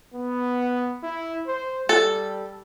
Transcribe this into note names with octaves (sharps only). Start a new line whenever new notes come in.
B3
E4
C5
G3 A4